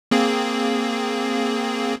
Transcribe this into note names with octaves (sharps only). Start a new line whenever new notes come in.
A#3 C4 G#4